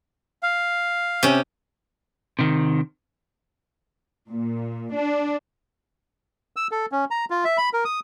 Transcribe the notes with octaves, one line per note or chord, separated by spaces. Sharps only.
F5
C3 C#4
C3 D#3
A#2
D4
E6
A4
C#4
A#5
F4
E5
B5
A#4
D#6